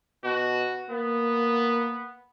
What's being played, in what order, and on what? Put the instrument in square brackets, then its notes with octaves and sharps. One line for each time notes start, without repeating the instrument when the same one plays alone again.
[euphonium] B2 [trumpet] F#4
[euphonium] A#3 [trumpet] B3